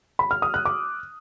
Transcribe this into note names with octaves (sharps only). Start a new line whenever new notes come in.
B5
F6
D#6
F#6
D6